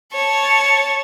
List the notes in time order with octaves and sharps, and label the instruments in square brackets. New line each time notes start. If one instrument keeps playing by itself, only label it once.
[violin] C#5 A5